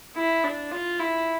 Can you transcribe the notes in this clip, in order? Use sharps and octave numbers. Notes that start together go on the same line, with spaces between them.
E4
D4
F4
E4